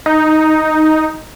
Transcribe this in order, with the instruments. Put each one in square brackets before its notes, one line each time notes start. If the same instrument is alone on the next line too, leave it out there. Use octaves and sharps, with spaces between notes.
[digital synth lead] D#4